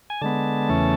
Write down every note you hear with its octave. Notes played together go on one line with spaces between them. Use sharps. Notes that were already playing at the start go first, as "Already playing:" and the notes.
G#5
D3 G#3 B3 A5
E2 C#3 E3 A3 C#4